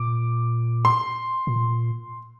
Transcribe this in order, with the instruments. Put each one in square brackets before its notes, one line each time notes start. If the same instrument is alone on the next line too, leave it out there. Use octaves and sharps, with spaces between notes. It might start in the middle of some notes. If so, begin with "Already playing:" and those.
Already playing: [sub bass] A#2 [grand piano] D6
[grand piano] C6
[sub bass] A#2